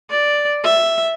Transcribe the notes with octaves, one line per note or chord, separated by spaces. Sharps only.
D5
E5